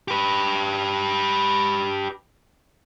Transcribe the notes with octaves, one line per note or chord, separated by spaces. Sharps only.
G4 B4